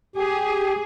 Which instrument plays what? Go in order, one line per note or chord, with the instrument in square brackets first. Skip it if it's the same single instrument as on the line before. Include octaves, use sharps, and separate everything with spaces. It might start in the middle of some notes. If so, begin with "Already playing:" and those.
[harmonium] G4 [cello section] G#4